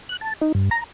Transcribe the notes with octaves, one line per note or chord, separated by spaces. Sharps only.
F#6
A5
D#4
G2
A#5